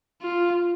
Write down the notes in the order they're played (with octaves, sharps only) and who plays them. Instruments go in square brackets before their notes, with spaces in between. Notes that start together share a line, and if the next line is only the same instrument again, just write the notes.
[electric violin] F4